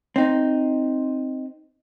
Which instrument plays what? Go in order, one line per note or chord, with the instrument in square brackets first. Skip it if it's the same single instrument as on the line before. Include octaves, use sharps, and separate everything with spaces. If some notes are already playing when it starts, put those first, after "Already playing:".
[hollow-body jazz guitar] C4 D#4